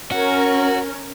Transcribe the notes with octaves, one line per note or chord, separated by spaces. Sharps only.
C#4 F#4 A#4